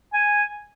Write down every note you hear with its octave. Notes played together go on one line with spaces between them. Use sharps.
G#5